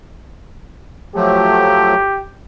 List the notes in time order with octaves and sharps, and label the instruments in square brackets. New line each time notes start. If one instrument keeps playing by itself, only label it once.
[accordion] F3 F#3 A3 [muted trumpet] G4